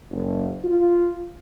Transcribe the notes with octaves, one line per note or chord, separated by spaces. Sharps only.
F#1
F4